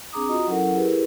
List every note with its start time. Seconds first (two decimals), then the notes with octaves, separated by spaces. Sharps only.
0.12 C4 D4 G#4 A#5 D6 D#6
0.29 F4 F#4 D#5 A#5 D#6
0.47 F#3 C#4 E4 A4 A#4 F#5
0.75 E4 G4 G#4 A#4 B4